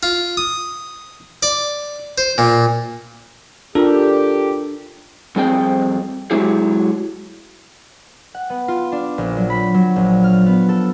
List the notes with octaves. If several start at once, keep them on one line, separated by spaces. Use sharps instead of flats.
F4
D#6
D5
C5
A#2
D4 F4 G4 A4 A#4
F2 G3 C4 G#4 D#5 G5
F#3 G#3 E4 G4 G#4
F#5
B3
F4
D4
A#1
F#3
B5
F#3
A#1
F6
B3
A4